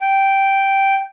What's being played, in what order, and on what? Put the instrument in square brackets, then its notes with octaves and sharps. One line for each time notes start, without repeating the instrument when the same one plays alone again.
[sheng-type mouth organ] G5